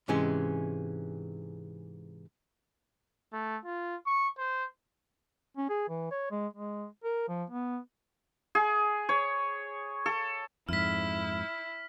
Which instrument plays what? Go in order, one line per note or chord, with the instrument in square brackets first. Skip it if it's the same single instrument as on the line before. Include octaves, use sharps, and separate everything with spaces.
[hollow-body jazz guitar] G#2 C3 E3 G#3 C#4
[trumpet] A3
F4
C#6
C5
[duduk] C#4
G#4
E3
C#5
G#3
G#3
A#4
F3
B3
[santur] G#4
C#5
A4
[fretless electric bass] F2 G#2 [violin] E4 [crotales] F6 B6